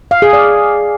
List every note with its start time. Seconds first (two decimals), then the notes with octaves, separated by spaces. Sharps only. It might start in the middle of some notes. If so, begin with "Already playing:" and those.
0.11 F5
0.22 G#4
0.33 D5